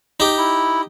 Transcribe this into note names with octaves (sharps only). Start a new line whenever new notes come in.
D#4 G4
E4